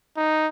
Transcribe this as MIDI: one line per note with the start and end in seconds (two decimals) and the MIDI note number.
0.17 0.48 63